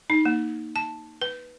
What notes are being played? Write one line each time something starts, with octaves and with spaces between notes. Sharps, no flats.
D#4
A#3
A5
B4